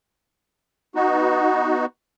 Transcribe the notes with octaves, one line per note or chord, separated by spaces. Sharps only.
B3 D#4 F#4